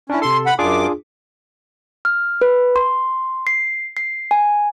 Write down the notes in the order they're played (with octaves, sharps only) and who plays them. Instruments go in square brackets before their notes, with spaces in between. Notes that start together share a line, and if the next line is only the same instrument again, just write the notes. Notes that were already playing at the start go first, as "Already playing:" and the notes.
[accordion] C#4 [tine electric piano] D4 E4
[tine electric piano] C3 A4 [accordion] C6
[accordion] F#5 B5
[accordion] F#2 D6 [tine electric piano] D4 F4 G#4
[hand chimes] F6
B4
C6
C7
C7
G#5